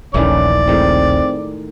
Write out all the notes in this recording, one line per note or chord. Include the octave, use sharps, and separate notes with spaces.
D#1 A#1 D#3 E3 A3 C#4 D5
A2 D#3 G#3 C4